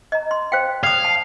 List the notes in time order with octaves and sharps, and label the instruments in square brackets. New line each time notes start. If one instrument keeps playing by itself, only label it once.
[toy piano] D#5 A#5
C6
C5 F5 G5
[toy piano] D5 D#6 [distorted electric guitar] F5
[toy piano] A5